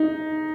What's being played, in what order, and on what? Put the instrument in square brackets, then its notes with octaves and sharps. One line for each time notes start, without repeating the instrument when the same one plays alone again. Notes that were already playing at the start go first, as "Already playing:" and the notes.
Already playing: [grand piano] D#4